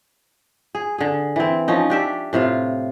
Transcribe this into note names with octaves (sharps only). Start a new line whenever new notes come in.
G#4
D3 G#4
E3 C4
F3 C#4 D#4
D4 G4 E5
A2 C3 F4 F5